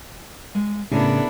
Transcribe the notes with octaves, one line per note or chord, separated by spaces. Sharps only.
G#3
A2 C#3 B3 D4 E4 G#4 A#4 D5